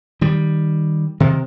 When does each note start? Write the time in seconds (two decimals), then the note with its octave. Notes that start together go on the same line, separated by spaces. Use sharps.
0.21 D#3 G3
1.20 C3 D#3